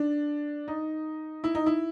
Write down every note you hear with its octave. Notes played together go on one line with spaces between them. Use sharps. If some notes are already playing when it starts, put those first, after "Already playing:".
Already playing: D4
D#4
E4
D#4
E4